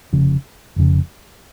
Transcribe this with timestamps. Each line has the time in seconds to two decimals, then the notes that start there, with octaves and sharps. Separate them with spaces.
0.13 F1 F2 C#3
0.76 F1 F2 C#3